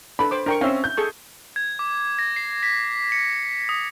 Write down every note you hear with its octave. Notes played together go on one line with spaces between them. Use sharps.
D4 A4 B4 B5
C5 D6
D4 A#4 G5 C#6
C4 C#4 E5 F5
G6
G#4 A4 C#6
G#6
D6
A#6
C7
B6
C#7
D#6